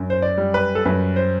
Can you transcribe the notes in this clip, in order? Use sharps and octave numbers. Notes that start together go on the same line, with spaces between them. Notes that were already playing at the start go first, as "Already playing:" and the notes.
Already playing: F#2
C5
D5
G3
B4
A4
F#2 B4
C5